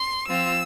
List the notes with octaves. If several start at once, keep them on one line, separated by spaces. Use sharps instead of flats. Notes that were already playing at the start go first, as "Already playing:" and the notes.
Already playing: C6
F3 C4 F4 E6